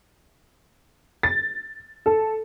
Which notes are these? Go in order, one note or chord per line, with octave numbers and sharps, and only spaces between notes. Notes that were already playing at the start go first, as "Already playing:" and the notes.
A6
A4